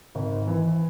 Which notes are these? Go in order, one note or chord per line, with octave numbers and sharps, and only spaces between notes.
G#1
E3